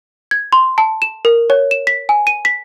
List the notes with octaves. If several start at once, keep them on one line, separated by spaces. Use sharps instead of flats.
G#6
C6
A5
E7
A#4
C#5
E7
B6
G#5
D#7
B6